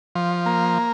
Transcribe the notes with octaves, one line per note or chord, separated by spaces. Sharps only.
F3
A#3